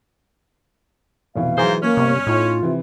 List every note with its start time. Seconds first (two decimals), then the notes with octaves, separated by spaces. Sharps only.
1.35 F1 B2 E3 F5
1.58 G#2 E3 F#3 G#4 A#4 C5
1.82 A#3 C#4
1.97 G1 C3
2.27 A2 D#4 F4
2.63 C3 E3